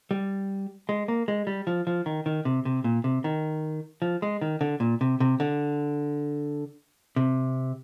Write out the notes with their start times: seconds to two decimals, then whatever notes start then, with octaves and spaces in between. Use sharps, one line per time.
0.11 G3
0.89 G#3
1.08 A#3
1.28 G#3
1.47 G3
1.67 F3
1.87 F3
2.06 D#3
2.26 D#3
2.45 C3
2.65 C3
2.84 A#2
3.04 C3
3.24 D#3
4.02 F3
4.22 G#3
4.41 D#3
4.61 D3
4.80 A#2
5.01 C3
5.20 C3
5.40 D3
7.16 C3